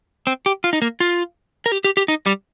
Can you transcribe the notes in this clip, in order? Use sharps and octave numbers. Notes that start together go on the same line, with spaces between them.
C4
G4
F4
D#4
A#3
F4
A#4
G4
G4
G4
D#4
G3